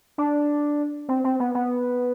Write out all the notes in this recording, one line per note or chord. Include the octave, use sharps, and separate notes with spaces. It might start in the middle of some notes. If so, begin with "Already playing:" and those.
D4
C4
C4
B3
B3